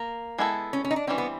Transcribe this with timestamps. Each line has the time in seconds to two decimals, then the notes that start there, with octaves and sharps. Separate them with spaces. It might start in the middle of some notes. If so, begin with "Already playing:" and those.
Already playing: A#3
0.38 G#3 B3 E4 A4
0.73 C#4
0.85 C#4
0.91 D#4
0.96 D4
1.07 E3 G3 C4 C#4
1.18 B3